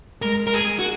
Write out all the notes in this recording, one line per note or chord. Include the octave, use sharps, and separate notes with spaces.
G#3 A#4
A#4
G#4
F#4